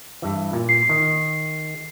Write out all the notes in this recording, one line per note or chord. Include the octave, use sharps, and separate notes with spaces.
G2 E3
A#2
C7
D#3